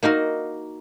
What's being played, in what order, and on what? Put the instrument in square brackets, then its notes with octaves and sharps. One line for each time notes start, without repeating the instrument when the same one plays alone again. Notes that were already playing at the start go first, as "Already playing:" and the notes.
[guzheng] A#3 D#4 F#4 A#4